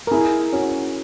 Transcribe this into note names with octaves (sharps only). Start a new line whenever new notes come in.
A#4
E4 G#4
C#4 F#4